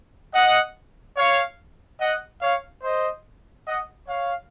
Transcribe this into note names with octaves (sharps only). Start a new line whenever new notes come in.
D#5 F#5
C#5 F5
D#5 F#5
C#5 F5
C5 D#5
D#5 F#5
C#5 F5